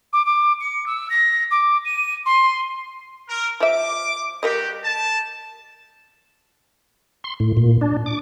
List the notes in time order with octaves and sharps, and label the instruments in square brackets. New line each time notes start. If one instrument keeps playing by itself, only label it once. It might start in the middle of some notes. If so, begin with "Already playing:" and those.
[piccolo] D6
D6
C#7
E6
A#6
D6
D#7
C6
[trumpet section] A#4
[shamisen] F3 E5 [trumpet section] D6
[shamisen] G3 A#4 D#5 [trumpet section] F#4 G4
[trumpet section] A5
[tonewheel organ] C6
A2
A#2
D4
D6